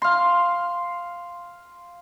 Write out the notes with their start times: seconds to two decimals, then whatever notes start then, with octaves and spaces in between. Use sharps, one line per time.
0.02 F5 C6